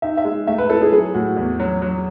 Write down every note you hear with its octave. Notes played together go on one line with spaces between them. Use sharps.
D#4 E5
E5
G#3
A3 E5
B4
E4 A4
G#4
F#3 G#4
A2 F#4
E2
F#3
F#3